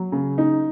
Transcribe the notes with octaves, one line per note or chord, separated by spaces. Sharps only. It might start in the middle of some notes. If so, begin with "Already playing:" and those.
Already playing: F#3
C#3
D#4